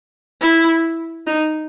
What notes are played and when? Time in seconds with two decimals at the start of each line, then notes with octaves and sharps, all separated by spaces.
0.42 E4
1.27 D#4